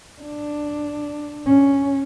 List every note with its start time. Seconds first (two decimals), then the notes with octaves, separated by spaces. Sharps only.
0.21 D4
1.46 C#4